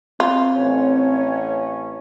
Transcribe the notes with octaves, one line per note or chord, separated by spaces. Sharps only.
C4 F4
A1 C#4 C#5